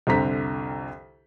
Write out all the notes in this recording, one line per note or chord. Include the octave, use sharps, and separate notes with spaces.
C2 F2 D3 C5 A#5 B6